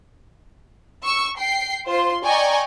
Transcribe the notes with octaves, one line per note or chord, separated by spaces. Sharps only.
C#6 E6
G5 C7
F4 C5 C6
D5 D#5 G5 G#5 A#5 C#6